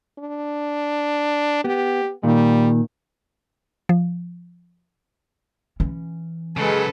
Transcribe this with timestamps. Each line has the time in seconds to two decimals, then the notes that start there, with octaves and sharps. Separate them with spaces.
0.19 D4
1.64 B3 G4
2.23 A#2 D#3 G3
3.89 F3
5.80 E3 C#4
6.57 C#3 F#3 G#3 A4 B4